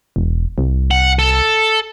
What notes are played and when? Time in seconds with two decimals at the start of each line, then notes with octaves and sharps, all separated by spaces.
0.16 E1
0.58 C2
0.91 F#5
1.19 A4